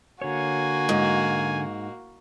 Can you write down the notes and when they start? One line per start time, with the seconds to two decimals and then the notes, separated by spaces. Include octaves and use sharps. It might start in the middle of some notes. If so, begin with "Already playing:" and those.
0.21 D3 A#3 F#4 C#5 G#5
0.89 G#2